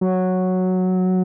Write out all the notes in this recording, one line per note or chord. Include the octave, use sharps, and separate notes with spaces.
F#3